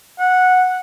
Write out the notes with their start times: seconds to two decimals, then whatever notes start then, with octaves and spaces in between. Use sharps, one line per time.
0.19 F#5